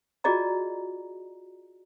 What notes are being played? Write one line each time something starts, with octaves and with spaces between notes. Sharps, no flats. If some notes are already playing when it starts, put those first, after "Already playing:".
F4 F#4 G#4 D5 D#5 A#5